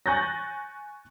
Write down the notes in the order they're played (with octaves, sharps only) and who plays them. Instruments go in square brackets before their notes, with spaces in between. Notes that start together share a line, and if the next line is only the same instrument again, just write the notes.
[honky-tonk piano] G#5 C#6 F#6 G6 A6 A#6